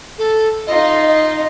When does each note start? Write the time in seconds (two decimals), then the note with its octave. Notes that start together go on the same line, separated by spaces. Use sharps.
0.18 A4
0.67 D#4 F4 D#5
1.07 D#5